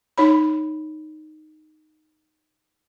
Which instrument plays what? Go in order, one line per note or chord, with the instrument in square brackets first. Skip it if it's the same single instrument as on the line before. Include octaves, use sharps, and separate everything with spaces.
[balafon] D#4 C#5 B5